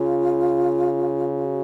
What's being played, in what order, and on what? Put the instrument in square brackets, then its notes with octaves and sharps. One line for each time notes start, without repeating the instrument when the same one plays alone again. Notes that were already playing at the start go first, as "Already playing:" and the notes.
Already playing: [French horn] C#3 [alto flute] F4
[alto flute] F#4